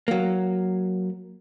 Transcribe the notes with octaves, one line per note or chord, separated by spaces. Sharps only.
F#3 A#3